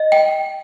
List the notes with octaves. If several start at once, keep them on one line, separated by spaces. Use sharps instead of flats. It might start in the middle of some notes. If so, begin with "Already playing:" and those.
Already playing: D#5
G5